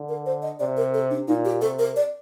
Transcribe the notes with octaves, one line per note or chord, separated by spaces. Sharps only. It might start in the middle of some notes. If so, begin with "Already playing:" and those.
Already playing: D3
A#4
C5
D#5
C3 D5
A#4
A4
D4
A#2 D#4
G4
C3 A4
A#4
D5